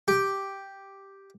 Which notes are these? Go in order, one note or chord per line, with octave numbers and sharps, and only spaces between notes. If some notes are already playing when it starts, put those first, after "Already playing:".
G4